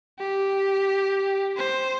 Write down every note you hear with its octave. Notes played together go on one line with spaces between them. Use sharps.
G4
C5